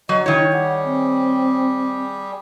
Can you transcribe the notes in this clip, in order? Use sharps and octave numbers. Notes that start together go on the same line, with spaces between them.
F#3 D#5
D#3 E4 C#5
G3 G4 G#4 F#5
C4